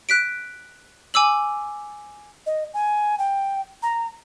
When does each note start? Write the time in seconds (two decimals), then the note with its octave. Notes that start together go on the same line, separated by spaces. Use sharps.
0.09 F#6 B6 D7
1.14 G#5 D6 E6 F#7
2.46 D#5
2.74 G#5
3.19 G5
3.83 A#5